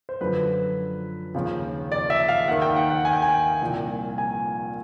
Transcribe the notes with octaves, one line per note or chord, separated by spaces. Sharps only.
C5
F#2 D3 F3 B4
D#2 C#3 F3
D5
E5
F5
D#2 D#3 F#5
G5
F#5
F#5
G#5
G5
G#5
C2 A#2 F3
G#5